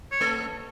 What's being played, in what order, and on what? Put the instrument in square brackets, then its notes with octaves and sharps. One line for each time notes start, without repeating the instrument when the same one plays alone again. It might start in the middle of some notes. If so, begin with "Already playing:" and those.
[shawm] C#5
[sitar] A3 A4